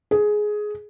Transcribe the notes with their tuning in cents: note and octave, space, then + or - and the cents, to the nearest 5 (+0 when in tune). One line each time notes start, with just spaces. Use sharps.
G#4 +10